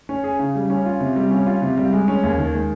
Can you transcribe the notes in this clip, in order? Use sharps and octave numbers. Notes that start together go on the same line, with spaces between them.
C#4
G#4
C#3
G3
C#4
F4
C3
G3
C#4
F4
C3
G3
G#3
C#4
D#2
D#3
G#3